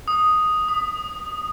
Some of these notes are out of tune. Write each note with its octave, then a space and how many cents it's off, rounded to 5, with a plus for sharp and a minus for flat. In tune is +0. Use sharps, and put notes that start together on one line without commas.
D#6 +0
D#6 -25